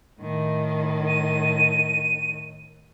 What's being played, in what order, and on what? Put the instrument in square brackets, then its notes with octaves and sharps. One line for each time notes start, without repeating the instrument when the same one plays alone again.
[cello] A2 D#3
[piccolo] D#7